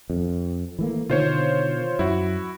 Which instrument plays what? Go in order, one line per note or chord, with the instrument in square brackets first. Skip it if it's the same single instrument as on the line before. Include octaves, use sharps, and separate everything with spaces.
[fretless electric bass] F2
E3 A3 A#3
[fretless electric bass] B2 D3 D#3 [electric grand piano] F4 C5 C#5
[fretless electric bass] F#2 [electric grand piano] E4 F#4